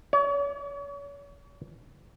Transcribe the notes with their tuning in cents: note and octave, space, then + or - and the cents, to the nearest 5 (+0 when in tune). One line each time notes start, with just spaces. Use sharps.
C#5 +40